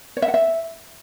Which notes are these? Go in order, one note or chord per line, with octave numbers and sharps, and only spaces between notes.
C#5
E5
F#5
E5